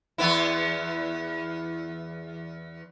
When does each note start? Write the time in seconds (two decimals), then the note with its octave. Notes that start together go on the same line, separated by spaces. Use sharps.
0.18 E2 B3 E4